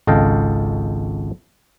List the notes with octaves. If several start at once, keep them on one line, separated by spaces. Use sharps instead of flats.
G#1 C#2 A4 D#5 F5 G5